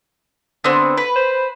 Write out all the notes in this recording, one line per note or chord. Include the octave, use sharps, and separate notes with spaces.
D3 B3 C4
B4
C5